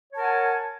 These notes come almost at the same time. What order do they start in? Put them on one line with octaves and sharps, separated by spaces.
C#5 A5 A#4 F#5 G#5